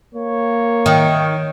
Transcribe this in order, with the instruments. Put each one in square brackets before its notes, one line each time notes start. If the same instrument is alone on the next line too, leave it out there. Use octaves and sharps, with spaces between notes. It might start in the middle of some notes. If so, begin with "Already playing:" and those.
[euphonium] A#3 [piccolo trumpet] C#5
[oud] D#3